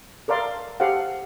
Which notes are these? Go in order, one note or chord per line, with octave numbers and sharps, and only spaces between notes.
A4 A#4 D5 F5 C6
G4 A4 C5 F5 F#5